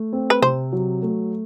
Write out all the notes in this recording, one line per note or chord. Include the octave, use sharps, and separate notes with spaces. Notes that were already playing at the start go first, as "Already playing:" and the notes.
Already playing: A3
C4
B4
C3 C5
F#3
A3